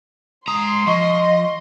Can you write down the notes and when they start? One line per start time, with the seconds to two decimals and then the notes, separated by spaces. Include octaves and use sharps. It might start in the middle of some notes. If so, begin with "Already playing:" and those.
0.48 G#3 A#5 C6 D#6
0.87 F3 D#5 C#6